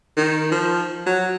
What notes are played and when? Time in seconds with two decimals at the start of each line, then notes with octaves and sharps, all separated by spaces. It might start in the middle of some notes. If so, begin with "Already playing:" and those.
0.17 D#3
0.51 F3
1.06 F#3